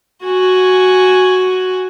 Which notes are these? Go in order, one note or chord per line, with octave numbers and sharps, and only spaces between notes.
F#4 G#5